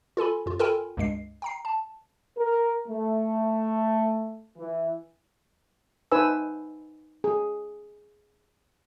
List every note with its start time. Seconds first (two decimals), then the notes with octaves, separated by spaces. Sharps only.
0.17 F4 A4 G#5 B5
0.46 F#2 F4
0.59 F4 A4 A#4 G5 G#5 B5
0.97 C#2 G2 G#3 C7
1.42 G5 A#5 C7
1.65 A5
2.37 A#4
2.88 A3
4.57 E3
6.12 D#4 B4 C5 G#5 E6
7.24 G#4